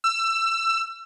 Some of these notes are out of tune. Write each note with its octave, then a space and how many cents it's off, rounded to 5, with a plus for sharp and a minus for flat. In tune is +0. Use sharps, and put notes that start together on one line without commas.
E6 +20